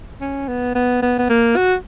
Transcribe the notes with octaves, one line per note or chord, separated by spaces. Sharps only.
C#4
B3
B3
B3
B3
A#3
F#4